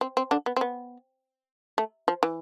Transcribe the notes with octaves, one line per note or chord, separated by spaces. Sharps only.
C4
C4
D3 D4
B3
C4
B3
A3
F3
E3